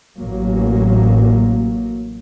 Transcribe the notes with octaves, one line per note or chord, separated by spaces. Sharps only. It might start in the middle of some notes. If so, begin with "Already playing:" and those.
A1 F#3 A#3